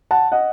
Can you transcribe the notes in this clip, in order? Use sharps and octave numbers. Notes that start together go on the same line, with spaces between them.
F#5 A5
D#5 F#5